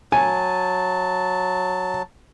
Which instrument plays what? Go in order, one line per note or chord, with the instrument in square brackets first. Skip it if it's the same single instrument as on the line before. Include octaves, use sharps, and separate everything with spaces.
[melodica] F#3 A5 [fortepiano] G#5